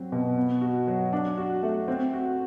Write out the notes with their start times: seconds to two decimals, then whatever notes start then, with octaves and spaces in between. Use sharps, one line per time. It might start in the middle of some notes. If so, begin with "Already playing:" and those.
Already playing: F#3 C4
0.12 B2
0.37 B3
0.62 F#4
0.87 F#3
1.13 D4
1.38 F#4
1.63 A3
1.88 C4
2.13 F#4